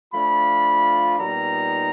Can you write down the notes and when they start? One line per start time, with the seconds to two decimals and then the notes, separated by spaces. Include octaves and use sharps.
0.13 F3 A3 D4 F4 B5
1.19 A#2 G3 B3 D#4 A#5